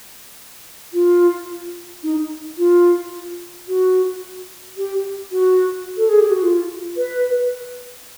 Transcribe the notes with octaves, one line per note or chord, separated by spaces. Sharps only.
F4
D#4
F4
F#4
G4
F#4
A4
G#4
G4
F#4
F4
B4